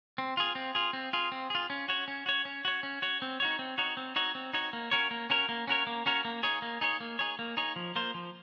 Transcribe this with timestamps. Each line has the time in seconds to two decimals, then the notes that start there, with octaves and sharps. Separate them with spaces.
0.18 C4
0.37 F4 G#4
0.55 C4
0.75 F4 G#4
0.93 C4
1.13 F4 G#4
1.32 C4
1.50 F4 G#4
1.70 C#4
1.89 F#4 C#5
2.08 C#4
2.26 F#4 C#5
2.45 C#4
2.65 F#4 C#5
2.83 C#4
3.02 F#4 C#5
3.22 C4
3.40 D#4 F#4 C#5
3.59 C4
3.78 D#4 F#4 C#5
3.97 C4
4.16 D#4 F#4 C#5
4.35 C4
4.53 D#4 F#4 C#5
4.73 A#3
4.91 C#4 F#4 A#4 C#5
5.11 A#3
5.30 C#4 F#4 A#4 C#5
5.49 A#3
5.68 C#4 F#4 A#4 C#5
5.87 A#3
6.06 C#4 F#4 A#4 C#5
6.25 A#3
6.43 D#4 G#4 C#5
6.62 A#3
6.81 D#4 G#4 C#5
7.00 A#3
7.19 D#4 G#4 C#5
7.39 A#3
7.57 D#4 G#4 C#5
7.76 F3
7.96 A#3 F4 C5
8.14 F3